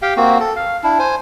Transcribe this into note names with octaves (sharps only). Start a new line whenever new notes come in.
G4 F5 G5
A#3 C4 F#4
A4
F5
D4 E4
C5 G#5